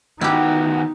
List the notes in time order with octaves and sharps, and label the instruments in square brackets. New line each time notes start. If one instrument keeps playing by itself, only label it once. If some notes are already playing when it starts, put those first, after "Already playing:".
[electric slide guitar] D#3 B3 F#4 [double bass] D#4 [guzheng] E4 G4